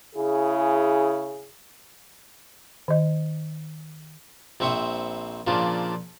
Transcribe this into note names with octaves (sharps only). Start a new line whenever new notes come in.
C#3 E4 G#4
D#3 D#5
A#1 C4 E5 C#6 D#6
A#2 C#3 F3 D4